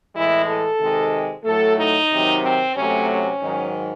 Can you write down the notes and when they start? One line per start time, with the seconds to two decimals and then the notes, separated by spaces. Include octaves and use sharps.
0.14 A2 E3 G#3 E4
0.47 A4
0.80 C3 D#3 G#3
1.45 A2 F#3 A3 A4
1.78 D#4
2.11 C3 D#3 F#3
2.43 C4
2.76 C3 F#3 A3 C#4
3.09 C#4
3.41 G#2 D#3 F#3